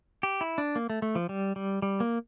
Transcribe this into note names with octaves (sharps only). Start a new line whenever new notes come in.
G4
E4
D4
A#3
A3
A3
F3
G3
G3
G3
A#3